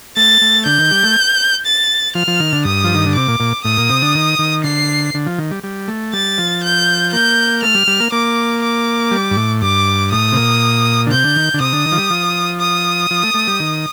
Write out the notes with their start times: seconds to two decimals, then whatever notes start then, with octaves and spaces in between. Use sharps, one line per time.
0.17 A3 A6
0.42 A3
0.66 D3 G6
0.78 D#3
0.91 G3
1.03 A3
1.66 A6
2.15 F3 F6
2.27 F3
2.40 D#3
2.53 D3
2.65 G2 D#6
2.84 F3
2.94 D#3
3.06 D3
3.15 C3 D6
3.28 A#2
3.40 A#2
3.64 A2 D#6
3.77 A#2
3.89 C3
4.02 D3
4.15 D#3
4.39 D#3
4.64 D3 C7
5.14 D3
5.26 F3
5.38 D#3
5.51 G3
5.64 G3
5.88 A3
6.13 G3 A6
6.38 F3
6.63 G6
7.13 A#3 G6
7.62 A3 F6
7.75 G3
7.87 G3
8.00 A#3
8.12 A#3 D6
8.62 D6
9.11 G3
9.31 G2
9.36 A2
9.61 G2 D6
10.11 A2 D#6
10.32 C3
10.36 A#2
11.07 D3
11.11 C3 G6
11.24 D3
11.36 D#3
11.54 D3
11.60 C3 D#6
11.73 D3
11.86 D#3
11.92 F3
11.98 G3
12.10 F3
12.60 D#6
13.11 F3
13.23 A3
13.34 A3
13.48 G3
13.60 D#3